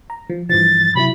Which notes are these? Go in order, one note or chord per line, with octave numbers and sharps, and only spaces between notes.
A#5
F3
G2 E3 F3 A6
C3 F#3 E4 B5